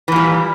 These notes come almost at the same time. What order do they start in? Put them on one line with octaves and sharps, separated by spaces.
E3 A#2 G3